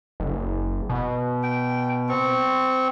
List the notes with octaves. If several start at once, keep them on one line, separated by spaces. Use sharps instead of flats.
F#1
B2
G5
C4 C#6